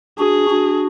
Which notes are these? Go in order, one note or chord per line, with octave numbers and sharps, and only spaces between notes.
D4 F#4 G#4
D4 F#4